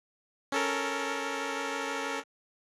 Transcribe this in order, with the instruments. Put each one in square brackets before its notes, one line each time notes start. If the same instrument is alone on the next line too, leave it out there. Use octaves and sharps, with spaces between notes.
[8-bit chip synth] C#4 A4 A#4